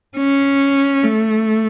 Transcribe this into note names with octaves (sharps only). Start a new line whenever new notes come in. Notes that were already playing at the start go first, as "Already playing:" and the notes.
C#4
A3